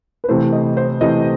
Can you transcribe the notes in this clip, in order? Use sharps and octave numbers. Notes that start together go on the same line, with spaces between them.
B4
C3 E3 A3 E4 C5
D#5
C5
C3 E3 A3 E4 D#5